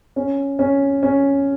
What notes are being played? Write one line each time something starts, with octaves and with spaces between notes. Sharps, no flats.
C#4
C#4
C#4